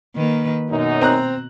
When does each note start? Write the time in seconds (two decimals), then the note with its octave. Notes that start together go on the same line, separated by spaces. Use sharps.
0.15 D#3 A#3 B4
0.70 F#2 B2 D#4
1.01 C4 A#5 F#6